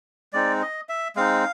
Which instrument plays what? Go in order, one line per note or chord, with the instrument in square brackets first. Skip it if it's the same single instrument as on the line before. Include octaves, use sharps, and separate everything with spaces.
[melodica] G#3 C4 D#4 D5
D#5
E5
G#3 C4 D#4 F5